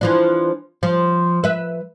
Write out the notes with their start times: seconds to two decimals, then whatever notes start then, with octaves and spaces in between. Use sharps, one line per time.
0.01 E3 F3 D4
0.83 F3
1.44 B4 E5